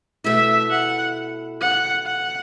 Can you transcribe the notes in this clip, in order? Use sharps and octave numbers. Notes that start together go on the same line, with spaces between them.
B2 A3 E4 E5
F#5
F#5
F#5